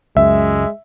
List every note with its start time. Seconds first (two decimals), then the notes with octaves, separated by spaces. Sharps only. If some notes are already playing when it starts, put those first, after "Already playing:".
0.17 C#2 F#2 G#3 E5